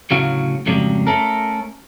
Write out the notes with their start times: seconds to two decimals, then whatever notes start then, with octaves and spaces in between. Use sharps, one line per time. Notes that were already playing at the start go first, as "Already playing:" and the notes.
0.11 D2 A2 C#3 F#3 F#4 F5
0.66 F2 G#2 C#3 F#3 G3
1.07 A3 C#4 A4 A#4